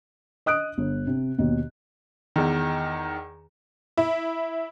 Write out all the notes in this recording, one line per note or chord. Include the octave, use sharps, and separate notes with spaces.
D#5 D#6 F#6 D7
G1
C3
D#2 B2
E2 D#3
E4